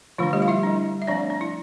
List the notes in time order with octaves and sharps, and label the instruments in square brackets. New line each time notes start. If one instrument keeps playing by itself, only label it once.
[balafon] D3 F3 A3 D4 F4
G3 G4
F5
E4 E5
G3 D4
E5
F3 A3 C4 D4 D5
D4
E4